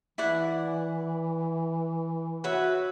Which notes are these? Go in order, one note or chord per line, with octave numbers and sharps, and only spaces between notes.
E3 E4 D5 F#5
F#4 B4 C#5 E5